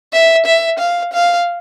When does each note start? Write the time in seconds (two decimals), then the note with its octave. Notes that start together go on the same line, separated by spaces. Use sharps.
0.12 E5
0.45 E5
0.79 F5
1.13 F5